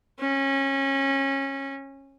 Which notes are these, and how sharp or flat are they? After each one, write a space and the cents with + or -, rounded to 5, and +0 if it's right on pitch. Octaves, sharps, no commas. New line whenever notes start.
C#4 -25